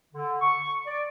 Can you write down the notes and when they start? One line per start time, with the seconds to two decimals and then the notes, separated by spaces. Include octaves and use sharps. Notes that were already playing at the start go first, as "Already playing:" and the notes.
0.13 D3
0.41 C#6
0.86 D5